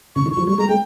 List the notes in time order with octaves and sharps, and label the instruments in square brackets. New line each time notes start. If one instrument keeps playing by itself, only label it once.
[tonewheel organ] C#3 [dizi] C#6
[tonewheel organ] D#3
[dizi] C#6
[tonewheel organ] F3
[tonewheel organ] G3 [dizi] C#6
[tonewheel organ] G#3 [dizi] A#5
[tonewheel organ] G#3 [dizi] G5